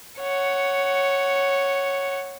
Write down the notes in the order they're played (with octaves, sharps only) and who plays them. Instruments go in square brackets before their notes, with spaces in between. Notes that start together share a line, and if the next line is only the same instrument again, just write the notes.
[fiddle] C#5 F#5